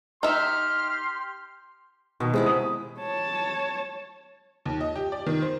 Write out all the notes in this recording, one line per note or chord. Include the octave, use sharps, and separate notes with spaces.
D#4 G4 E5 C6 F6
B2 D#3
C3 G#3 E4 D5
D#6
C#5 A5
D#2
D#5
G4
D5
D#3
C5